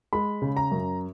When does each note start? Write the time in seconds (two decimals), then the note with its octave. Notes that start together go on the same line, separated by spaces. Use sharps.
0.13 G#3 B5
0.42 C#3
0.57 A#5
0.71 F#2